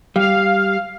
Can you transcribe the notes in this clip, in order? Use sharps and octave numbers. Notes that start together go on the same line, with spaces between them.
G3 F5